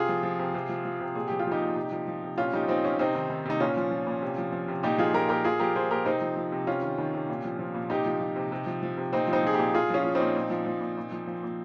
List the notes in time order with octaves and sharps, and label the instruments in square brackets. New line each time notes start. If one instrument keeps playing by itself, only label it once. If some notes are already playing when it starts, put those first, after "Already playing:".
Already playing: [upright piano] C3 F4 G#4
F3
F3
C3
C3
F3
F3
C3
A#2 G#4
F3 G4
F4
F3 D#4 G4
A#2
C3
F3
F3
C3
A#2 C#4 F4
F3 D#4 G4
F3 C4 D#4
A#2 C#4
C3 C4 D#4
D#3
D#3
C3 D#4
A#2 C#4 F4
F3
F3
A#2
C3
F3
F3
C3
A#2 D#4 G4
F3 F4 G#4
F3 G4 A#4
A#2 G4 A#4
A#2 F4 G#4
F3 G4 A#4
F3 G#4 C5
A#2 G4 A#4
C3 C4 D#4
F3
F3
C3
C3 C#4 F4
D#3
D#3
C3
A#2
F3
F3
A#2
C3 D#4 G4
F3
F3
C3
C3
F3
F3
C3
A#2 C4 D#4
F3
C4 D#4
F3 G#4
A#2 D#4 G4
A#2 F4 G#4
F3 C#4 F4
F3
A#2 C4 D#4
A#2
F3
F3
A#2
A#2
F3
F3
A#2